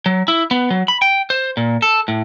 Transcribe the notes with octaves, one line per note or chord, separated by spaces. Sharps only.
F#3
E4
B3
F#3
B5
G5
C5
A#2
A4
A2